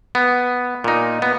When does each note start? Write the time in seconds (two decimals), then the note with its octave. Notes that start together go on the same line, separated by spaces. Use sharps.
0.15 B3
0.84 A#2 D#4
1.22 B3